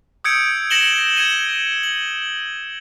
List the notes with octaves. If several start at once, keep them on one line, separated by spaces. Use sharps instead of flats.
D#6 E6 G6 G#6 C#7 D7
A#6 C#7 E7 F#7 G7
G#6 C#7 D#7 G7
F#7